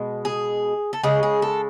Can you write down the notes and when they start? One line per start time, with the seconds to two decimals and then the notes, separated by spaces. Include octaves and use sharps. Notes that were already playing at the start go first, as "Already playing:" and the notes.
Already playing: B2 G#3
0.25 G#4
0.93 A4
1.03 C#3 G#3 G#4
1.23 G#4
1.42 A4